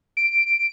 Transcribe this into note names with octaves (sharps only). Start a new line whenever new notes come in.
D7